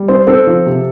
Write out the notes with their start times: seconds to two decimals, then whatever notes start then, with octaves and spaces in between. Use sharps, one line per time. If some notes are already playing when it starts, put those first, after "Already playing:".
Already playing: G3
0.08 C4 C5
0.27 C4 A4
0.47 F3
0.66 C3